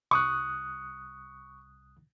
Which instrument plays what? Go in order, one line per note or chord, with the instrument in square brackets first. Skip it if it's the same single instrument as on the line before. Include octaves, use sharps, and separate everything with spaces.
[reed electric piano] C2 D#6 F#6 [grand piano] C#6